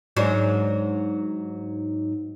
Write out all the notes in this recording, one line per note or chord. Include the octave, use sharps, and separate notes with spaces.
G#2 F#3 D4